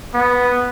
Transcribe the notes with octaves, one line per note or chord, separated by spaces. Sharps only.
B3